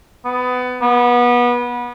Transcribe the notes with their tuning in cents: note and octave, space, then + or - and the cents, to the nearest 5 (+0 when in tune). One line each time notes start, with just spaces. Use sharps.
B3 +20
B3 -25